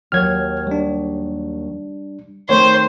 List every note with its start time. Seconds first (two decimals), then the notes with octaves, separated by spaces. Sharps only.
0.12 D#2 F#3 C#5 F6 G#6
0.67 G3 D4
2.49 D#3 A3 C4 C5 C#5